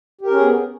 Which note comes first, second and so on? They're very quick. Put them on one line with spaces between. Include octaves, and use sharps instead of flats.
G4 A#4 C#4 G#4 B3